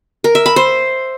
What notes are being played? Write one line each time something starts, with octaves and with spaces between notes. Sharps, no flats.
A#4
E5
B5
C5